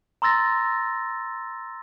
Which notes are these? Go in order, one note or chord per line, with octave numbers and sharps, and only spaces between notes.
A#5 C6 E6 A6 A#6